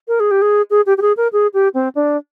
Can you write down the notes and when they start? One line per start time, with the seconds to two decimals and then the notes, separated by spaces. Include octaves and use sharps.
0.08 A#4
0.20 G#4
0.31 G4
0.42 G#4
0.70 G#4
0.86 G4
0.98 G4
1.02 G#4
1.17 A#4
1.33 G#4
1.54 G4
1.74 C4
1.95 D4